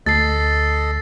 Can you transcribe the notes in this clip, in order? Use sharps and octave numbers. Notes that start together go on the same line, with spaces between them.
D2 A4 D#5 A6 C7